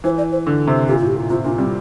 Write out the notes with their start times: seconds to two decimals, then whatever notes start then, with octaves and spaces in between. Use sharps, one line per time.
0.04 E3 C5
0.18 D5
0.32 C5
0.47 D3
0.67 C3
0.88 A#2 G4
0.97 F4
1.02 A2
1.07 G4
1.16 A#2
1.30 C3 F4
1.44 A#2 D4
1.58 G3 C4